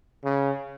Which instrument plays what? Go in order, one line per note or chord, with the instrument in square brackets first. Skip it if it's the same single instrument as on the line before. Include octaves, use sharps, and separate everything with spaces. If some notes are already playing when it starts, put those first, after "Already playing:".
[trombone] C#3